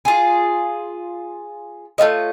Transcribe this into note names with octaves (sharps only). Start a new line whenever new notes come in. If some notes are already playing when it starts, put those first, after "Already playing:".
F4 G#4
A3 F4 C#5 D#5